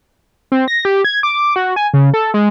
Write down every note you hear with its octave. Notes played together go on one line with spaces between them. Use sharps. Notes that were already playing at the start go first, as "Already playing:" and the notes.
C4
A#6
G4
G#6
D6
F#4
G#5
C#3
A4
G#3